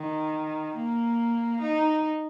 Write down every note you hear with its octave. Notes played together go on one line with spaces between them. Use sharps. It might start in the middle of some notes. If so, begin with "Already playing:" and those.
Already playing: D#3
A#3
D#4